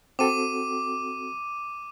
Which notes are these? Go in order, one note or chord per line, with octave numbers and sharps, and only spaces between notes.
C4 F#4 A4 D6 D#7